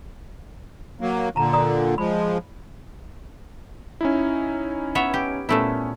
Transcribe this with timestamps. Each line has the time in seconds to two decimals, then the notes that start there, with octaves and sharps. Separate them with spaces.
1.01 F#3 A#3
1.36 A#2 D3 A5 A#5
1.53 D5 A#5 D#6
1.98 F3 G#3 B5
4.01 C#4 D#4 E4
4.95 B3 C#5 E5
5.14 G4
5.49 A#2 A3 B3 C#4 E4